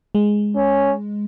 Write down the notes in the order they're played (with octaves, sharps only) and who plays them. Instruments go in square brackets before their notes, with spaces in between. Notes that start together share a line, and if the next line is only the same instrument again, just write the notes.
[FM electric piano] G#3
[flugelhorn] C#4